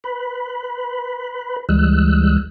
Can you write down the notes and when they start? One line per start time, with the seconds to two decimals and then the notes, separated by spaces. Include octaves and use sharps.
0.04 B4 B5
1.69 D2 E3 G3 G#3 E6 F#6